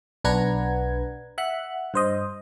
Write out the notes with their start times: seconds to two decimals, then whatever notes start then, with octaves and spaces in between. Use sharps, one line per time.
0.24 B1 D4 B4 F#5 A#5 G#6
1.38 E5 F#5 F#6
1.94 G2 C5 D#5